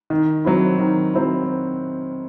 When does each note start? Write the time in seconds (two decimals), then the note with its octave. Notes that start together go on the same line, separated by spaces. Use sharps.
0.10 D#3
0.45 F#3 C4 E4
0.79 D#3
1.14 F#3 C4 E4